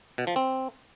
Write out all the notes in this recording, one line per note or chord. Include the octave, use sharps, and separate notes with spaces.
B2
F3
C4